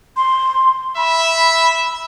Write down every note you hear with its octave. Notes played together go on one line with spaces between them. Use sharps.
C6
E5 B5